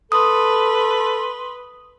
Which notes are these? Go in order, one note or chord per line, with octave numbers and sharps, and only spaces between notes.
A4 B4 C6 D#6